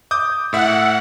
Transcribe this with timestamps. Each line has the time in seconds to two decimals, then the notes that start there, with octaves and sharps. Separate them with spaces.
0.11 D6 D#6 G6
0.53 A2 E5 F#5 E6